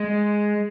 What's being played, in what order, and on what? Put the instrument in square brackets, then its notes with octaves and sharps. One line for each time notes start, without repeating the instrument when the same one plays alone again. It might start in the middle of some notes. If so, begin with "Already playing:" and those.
Already playing: [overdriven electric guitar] G#3